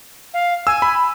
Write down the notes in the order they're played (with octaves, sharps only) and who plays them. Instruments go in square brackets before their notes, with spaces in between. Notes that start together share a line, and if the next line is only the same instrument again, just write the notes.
[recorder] F5
[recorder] G#5 [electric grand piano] E6
[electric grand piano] B5